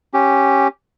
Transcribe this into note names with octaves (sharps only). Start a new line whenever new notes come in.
C#4 G4